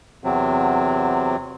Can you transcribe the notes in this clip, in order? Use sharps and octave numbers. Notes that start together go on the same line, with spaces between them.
E2 C3 F#3 C4